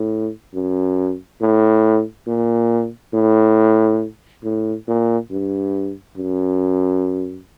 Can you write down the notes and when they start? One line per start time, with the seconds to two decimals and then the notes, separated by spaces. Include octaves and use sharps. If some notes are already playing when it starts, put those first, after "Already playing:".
Already playing: A2
0.54 F#2
1.41 A2
2.28 A#2
3.14 A2
4.44 A2
4.88 A#2
5.31 G2
6.18 F#2